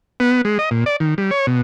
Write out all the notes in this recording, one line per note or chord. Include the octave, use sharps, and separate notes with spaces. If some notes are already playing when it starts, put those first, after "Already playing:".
B3
G#3
D#5
A#2
D5
D#3
G3
C#5
B2